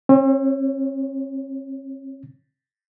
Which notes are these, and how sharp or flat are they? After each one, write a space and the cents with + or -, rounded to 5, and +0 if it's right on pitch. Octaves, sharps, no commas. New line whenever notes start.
C4 +45 C#5 +0